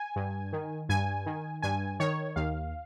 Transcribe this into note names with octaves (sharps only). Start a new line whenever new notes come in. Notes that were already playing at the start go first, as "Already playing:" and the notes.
Already playing: G#5
G2
D#3
G2 G#5
D#3
G2 G#5
D#3 C#5
D#2 F5